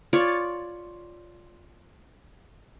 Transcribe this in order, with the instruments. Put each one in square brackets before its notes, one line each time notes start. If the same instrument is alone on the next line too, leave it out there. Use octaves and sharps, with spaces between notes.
[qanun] F4 C#5 D5